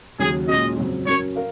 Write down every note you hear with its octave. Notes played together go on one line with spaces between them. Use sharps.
D#2 C#3 F#3 G#4
A#2 G#3 C#4 F#4 D#5
F2 C#3 F#3
F#3 C#4 F#4 A#4 C#5
A#4 F5